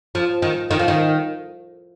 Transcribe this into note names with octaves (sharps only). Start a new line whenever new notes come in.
F3
D#3
D#3
F3
D#3